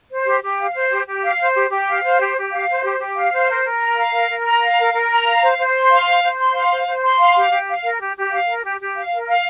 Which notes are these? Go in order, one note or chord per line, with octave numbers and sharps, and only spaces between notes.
C5
G4
G4
F5
C5
G4
G4
F5
C5
G4
G4
F5
C5
G4
G4
F5
C5
G4
G4
F5
C5
A#4
A#4
A#5
F5
A#4
A#4
A#5
F5
A#4
A#4
A#5
F5
C5
C5
C6
F5
C5
C5
C6
F5
C5
C5
C6
F5
G4
G4
F5
A#4
G4
G4
F5
A#4
G4
G4
F5
A#4
F5